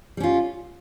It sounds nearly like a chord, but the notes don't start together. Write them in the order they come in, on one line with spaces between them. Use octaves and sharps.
G3 C#4 F4